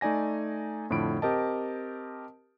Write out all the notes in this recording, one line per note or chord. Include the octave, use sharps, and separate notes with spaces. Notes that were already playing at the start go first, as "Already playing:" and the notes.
A3 D#4 D5 G#5 A#6
F2 A2 D3 B5 D7
C4 G4 A#4 D#5 A5